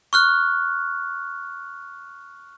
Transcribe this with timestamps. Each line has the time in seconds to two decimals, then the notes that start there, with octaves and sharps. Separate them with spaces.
0.13 C#6 F6 F#6